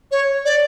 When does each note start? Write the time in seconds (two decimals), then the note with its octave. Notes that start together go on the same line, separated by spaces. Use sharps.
0.11 C#5
0.45 D5